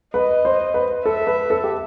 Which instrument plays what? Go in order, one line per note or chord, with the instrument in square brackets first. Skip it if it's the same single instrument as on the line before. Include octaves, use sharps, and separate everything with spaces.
[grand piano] B4 [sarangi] D#5
[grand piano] C5
B4
[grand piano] A4 [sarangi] E5
[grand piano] B4
A4
G4